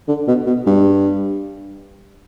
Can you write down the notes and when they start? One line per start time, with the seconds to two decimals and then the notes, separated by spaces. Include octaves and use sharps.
0.08 D3
0.27 B2
0.46 B2
0.66 G2